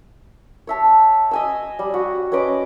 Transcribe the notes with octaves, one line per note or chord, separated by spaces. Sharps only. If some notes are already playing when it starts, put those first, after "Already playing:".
C#5 E5 A5
D#5 G#5 E6
G3
F#4
C#4 B4 D#5 D6